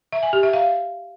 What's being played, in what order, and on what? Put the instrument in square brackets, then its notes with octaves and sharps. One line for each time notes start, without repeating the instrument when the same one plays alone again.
[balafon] E5
G#5
G4
E5
F5